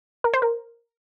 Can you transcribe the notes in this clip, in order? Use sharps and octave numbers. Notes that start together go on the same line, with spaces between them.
A#4
C5
A#4